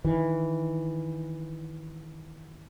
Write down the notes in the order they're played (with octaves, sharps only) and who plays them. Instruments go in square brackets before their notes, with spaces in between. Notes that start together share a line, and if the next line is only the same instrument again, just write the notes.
[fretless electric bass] D#3 E3